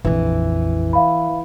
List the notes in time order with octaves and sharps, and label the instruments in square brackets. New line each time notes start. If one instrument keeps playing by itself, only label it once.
[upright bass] A#1 F2 [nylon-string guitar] E3
[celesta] E5 F5 B5